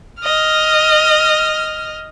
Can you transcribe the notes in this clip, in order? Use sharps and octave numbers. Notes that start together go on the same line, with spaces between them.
D#5 F6